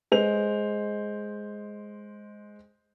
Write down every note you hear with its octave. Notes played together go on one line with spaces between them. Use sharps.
G#3 C5 F7